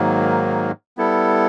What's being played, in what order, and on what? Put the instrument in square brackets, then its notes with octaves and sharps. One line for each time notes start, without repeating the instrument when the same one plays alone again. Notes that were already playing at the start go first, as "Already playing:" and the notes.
Already playing: [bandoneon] G#2 D#3 F#3 A#3
G3 B3 E4 A4